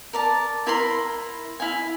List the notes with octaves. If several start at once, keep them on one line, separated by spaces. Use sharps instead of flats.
A#4 D5 A5
E4 A#4 B5 C6
E4 F5 G#5